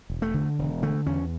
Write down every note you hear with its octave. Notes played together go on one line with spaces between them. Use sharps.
E1
A3
D3
E1
D3 A3
E2 C#4